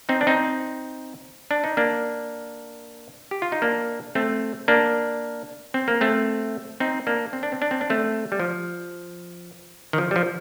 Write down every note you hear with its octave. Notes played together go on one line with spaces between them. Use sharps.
C4 D#4
D4
C4 D#4
D4
D#4
A#3 D4
G4
F4
D#4
A#3 D4
A3 C4
A#3 D4
C4
A#3
A3 C4
C4 D#4
A#3 D4
C4
D4
C4
D4
C4
D4
A3 C4
G3
F3
D#3
F3
G3
F3